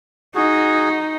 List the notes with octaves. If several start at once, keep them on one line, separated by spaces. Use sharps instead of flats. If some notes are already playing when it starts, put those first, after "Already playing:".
D#4 F#4 G#4